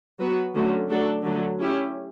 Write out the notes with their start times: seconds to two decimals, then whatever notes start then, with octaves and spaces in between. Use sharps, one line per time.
0.20 F#3 B3 F#4 B4
0.54 D3 F#3 A3 C#4 F#4
0.89 F#3 A3 D4 F#4 A4
1.25 D3 F#3 A3
1.60 C#4 E4 G4